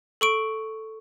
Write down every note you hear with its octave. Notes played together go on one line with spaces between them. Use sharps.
A4 C#6 D7